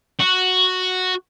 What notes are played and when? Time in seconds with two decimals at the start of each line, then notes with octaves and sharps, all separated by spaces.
0.19 F#4